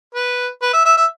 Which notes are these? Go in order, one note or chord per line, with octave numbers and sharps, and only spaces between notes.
B4
B4
E5
E5
E5